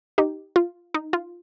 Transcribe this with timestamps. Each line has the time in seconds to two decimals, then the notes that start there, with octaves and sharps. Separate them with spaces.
0.18 D#4 G4
0.56 F4
0.94 D#4
1.13 F4